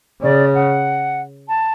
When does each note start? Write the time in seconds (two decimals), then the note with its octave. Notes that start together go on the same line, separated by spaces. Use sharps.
0.22 C#3 D5
0.54 F#5
1.48 A5